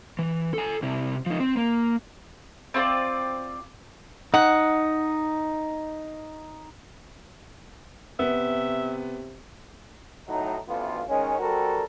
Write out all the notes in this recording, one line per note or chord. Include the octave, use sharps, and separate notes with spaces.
E3
A4 G#5
C3 E4
F3 D#4
C4
A#3
C4 F4 C5 D5
D#4 F#5
C3 B3 E5
A2 F#3 D#4
A1 D2 B3 F4
D#3 G#3 C#4
G3 C4 F#4 A4 A#4